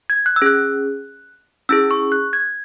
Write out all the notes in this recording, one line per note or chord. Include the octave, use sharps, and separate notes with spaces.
G#6
F#6
E6
C#4 G#4 F#6
C#4 E4 G#4 E6
C#6
F#6
G#6